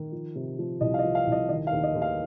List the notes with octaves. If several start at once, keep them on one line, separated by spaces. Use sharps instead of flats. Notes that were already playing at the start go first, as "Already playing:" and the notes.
Already playing: D#3
F3
C3
F3
C2 D#5
F5
D#5
F3
F5
C2
D#5
D#3 D#5
F5
D#2
D#5
D#2
F5